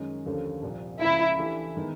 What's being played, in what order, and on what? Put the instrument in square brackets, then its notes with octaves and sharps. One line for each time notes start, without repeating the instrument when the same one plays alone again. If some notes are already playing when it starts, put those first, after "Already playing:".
Already playing: [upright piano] F#2 D#3 G#3 C#4
D#2 D3 F3 A3 C#4
C2 A#2 F3
[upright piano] C#2 C#3 F3 A#3 [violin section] E4
[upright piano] E3 A3 D4 G4
D#3 G#3 B3 D#4